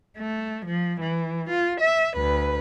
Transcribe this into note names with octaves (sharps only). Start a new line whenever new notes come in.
A3
F3
E3
F4
E5
D2 B4